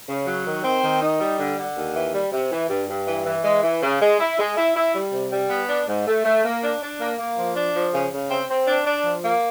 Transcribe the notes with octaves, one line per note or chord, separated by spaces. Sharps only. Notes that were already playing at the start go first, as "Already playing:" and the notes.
C#3
F#3
D#3
C4
D#3
D#4
G3
D3
D3
D#2
E3
G3
C3
E3
G2
G2
E3
E3
G#3
E3
C#3
G#3
E4
G#3
E4
E4
G3
C3
G3
B3
D4
G#2
A3
A3
A#3
D4
D4
A#3
A#3
F3
D4
F3
C#3
C#3
C4
C4
D4
D4
F3
A#3